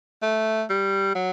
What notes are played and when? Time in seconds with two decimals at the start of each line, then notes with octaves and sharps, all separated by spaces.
0.22 A3
0.70 G3
1.15 F#3